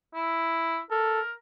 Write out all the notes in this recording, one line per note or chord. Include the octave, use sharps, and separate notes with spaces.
E4
A4 A#4